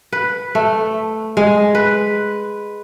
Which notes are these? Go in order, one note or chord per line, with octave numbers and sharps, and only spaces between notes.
B4
A3
G#3
B4